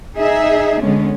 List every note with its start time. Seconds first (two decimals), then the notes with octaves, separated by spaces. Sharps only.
0.17 D#4 G#4 E5
0.82 D3 G#3 B3 C#4